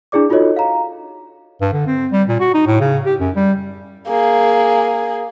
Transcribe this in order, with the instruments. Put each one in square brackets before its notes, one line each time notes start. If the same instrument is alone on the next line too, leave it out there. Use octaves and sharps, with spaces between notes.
[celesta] D4 E4 G#4 D5 D6
D#4 F4 F#4 A4 C#5 D#5
F5 A#5
[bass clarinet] G2
D3
C4
G3
A#2
F#4
D#4
A2
C#3
G4
F#2
G3
[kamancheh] A#3 G#4